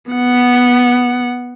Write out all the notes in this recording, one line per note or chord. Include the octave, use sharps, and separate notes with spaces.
B3 F#5